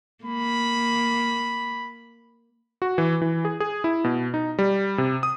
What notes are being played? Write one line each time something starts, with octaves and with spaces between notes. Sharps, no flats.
A#3 B5
F#4
E3
E3
G#4
G#4
E4
B2
D#4
G3
C3
D#6